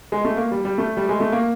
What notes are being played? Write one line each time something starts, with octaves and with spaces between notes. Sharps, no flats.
G#3
A3
A#3
G3
G3
A3
G3
G#3
A3
A#3